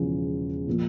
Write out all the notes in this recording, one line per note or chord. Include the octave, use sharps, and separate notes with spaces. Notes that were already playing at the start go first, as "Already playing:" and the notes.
Already playing: E1 E2 C#3 F3
A#2 F3 A#3